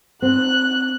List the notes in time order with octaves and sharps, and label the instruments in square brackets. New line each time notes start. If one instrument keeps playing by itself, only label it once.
[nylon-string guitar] C4 [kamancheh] F#6